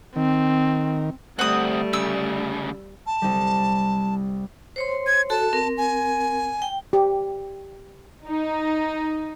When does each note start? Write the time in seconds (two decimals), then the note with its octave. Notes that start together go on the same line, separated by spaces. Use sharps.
0.16 D#3 C4
1.39 D2 G3 A3 C4 F#5 D#6
1.93 D2 C#3 E6
3.06 A5
3.22 C2 G3
4.76 C5 C#5 C6
5.07 G#6
5.30 F#4 A4 A5
5.53 C4 A#4
5.78 G#5
6.62 G5
6.93 G4
8.27 D#4